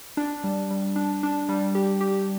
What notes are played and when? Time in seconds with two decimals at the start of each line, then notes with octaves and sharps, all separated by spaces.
0.17 D4
0.44 G3
0.71 G3
0.96 D4
1.23 D4
1.49 G3
1.75 G4
2.01 G4